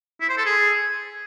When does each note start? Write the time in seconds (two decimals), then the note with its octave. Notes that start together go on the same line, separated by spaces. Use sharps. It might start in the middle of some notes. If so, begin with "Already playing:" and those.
0.21 E4
0.29 C5
0.37 A4
0.46 G#4